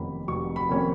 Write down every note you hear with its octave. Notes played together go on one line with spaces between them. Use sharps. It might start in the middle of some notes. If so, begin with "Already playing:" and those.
Already playing: F1 F2 D#3 A#3 C#4 B5
F1 C#6
B5
F2 D#3 A#3 C#4